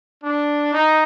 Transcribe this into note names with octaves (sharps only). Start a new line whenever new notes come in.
D4
D#4